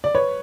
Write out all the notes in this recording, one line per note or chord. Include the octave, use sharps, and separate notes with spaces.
D5
B4 C#5